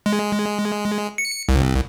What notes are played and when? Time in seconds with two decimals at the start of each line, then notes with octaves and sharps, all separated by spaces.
0.06 G#3
1.18 C#7
1.49 C2